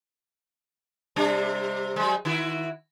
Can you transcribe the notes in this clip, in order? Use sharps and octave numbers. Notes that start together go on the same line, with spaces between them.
C3 G3 D4
F#3 G#3
D#3 E4 F#4